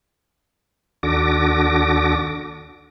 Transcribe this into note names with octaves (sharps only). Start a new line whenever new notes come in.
D#2 D4 F#4 A4 D6 A#6